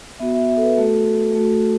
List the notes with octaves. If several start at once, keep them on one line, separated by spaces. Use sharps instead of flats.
B3 F#4 E5
E5
E5
A4
B4
A3 F#4 A4
A3 F#4